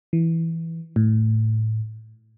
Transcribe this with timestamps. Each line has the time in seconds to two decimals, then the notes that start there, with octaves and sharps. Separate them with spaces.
0.13 E3
0.96 A2